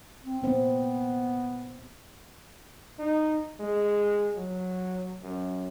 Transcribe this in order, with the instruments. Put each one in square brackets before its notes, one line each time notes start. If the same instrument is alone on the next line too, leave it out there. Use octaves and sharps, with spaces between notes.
[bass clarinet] C4
[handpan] A#2 C4 [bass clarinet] B3
[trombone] D#4
G#3
F#3
F#2